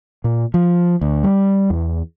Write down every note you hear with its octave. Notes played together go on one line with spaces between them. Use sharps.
A#2
F3
D2
G3
E2